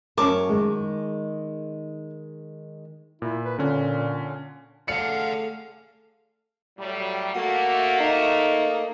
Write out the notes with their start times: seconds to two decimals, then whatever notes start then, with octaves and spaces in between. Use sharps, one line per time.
0.17 F#2 C#4 A#4 A5 C#6 D6
0.49 D#3 G#3
3.22 A#2 E4
3.45 B4
3.58 A#2 D3 C#4
4.88 A3 G4 G#4 D5 F5 F#5 C#7
6.79 A2 F#3 G3
7.35 A3 A#3 F#4
8.00 D#4